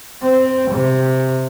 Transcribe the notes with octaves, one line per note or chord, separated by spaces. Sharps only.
C4
C3